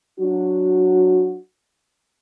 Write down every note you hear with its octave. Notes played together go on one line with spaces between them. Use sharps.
F#3 D4 F#4